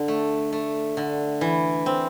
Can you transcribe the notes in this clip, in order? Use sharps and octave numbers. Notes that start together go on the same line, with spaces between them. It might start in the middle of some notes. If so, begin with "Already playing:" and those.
Already playing: D3
A3
A3
D3
E3
C4